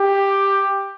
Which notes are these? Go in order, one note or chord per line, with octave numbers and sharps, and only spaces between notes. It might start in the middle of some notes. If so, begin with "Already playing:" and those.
Already playing: G4